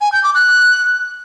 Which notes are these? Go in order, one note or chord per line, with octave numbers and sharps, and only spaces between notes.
G#5
G6
D6
F#6